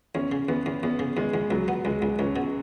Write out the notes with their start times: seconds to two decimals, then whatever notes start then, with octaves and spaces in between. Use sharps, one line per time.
0.15 E2 C#4
0.32 C#3
0.48 E2 B3
0.66 E2
0.83 E2 B3
0.99 C#3
1.17 E2 G#3
1.34 E2
1.51 C#2 F#3
1.68 B3
1.85 C#2 G#3
2.02 C#2
2.19 C#2 C#4
2.36 B2